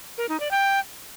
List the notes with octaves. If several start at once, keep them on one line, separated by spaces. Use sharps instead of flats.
A#4
D#4
D5
G5